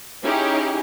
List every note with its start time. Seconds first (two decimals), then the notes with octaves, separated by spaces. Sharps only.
0.24 C#4 D#4 E4 G4 G#4